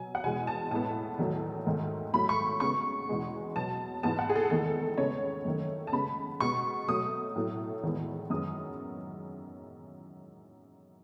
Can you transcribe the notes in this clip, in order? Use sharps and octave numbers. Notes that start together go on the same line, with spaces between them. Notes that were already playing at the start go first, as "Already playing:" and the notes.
Already playing: B2 F#3 G#5
F#5
E2 B2 G#3 G#5
A5
A2 G#3 B3 A5
E2 D#3 F#3 A3
G#2 D#3 A3
G#2 F#3 A3 B5
C#6
C#3 G#3 B3 C#6
E2 B2 G#3 B3
B2 F#3 B3 A5
G#2 E3 G#3 B3 A5
F#5
G#4
A4
E2 D#3 A3 A4
C#3 G#3 B3 C#5
F#2 D#3 A3
A5
C#3 G#3 B3 B5
B2 G#3 B3 C#6
B2 F#3 A3 D#6
A2 F#3 A3
E2 D#3 G#3 B3
F#2 D#3 G#3 B3 D#6